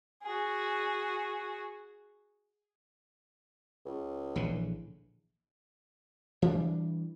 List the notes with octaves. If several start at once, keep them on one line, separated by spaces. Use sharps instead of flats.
F#4 G#4
C#2
A#1 D3 E3
E3 G3 G#3 D4